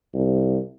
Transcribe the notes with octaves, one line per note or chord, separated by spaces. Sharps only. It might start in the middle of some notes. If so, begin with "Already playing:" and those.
C2